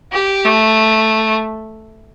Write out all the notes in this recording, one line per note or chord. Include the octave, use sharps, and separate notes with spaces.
G4
A3